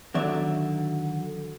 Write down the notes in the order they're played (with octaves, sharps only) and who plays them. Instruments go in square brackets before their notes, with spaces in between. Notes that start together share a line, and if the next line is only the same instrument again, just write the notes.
[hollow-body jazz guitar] D3 D#3 F#3 D5 E5